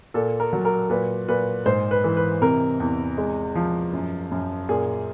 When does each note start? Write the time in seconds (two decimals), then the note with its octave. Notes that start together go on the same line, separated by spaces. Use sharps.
0.14 A#2 A4
0.40 A#4
0.53 F#3
0.65 A#4
0.90 A#2 B4
1.28 A#2 B4
1.66 G#2 C5
1.91 B4
2.04 E3
2.17 B4
2.41 C3 A#4
2.80 E2
3.18 G#3
3.55 F3
3.93 F#2
4.31 F#2
4.69 A#2 G#4